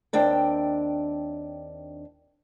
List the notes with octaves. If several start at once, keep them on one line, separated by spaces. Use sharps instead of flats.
D#2 C4 D4 G5